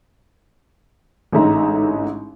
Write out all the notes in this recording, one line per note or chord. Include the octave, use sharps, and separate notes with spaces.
A1 G#2 D3 D#4 E5 A#5